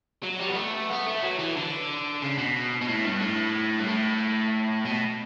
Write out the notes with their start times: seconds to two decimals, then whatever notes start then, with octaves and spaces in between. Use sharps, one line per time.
0.24 F#3
0.40 G3
0.49 B3
0.57 A3
0.90 B3
1.07 A3
1.22 F#3
1.39 E3
1.56 D3
2.22 C#3
2.38 B2
2.81 B2
2.88 A2
3.05 G2
3.20 A2
3.79 G2
3.86 A2
4.86 B2